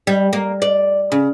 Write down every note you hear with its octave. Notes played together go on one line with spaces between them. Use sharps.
G3
A#3
D5
C#3